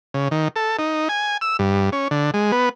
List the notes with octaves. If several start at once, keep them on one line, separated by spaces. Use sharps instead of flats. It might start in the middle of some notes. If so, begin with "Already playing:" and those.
C#3
D#3
A4
D#4
G#5
E6
G2
C#4
D3
G#3
B3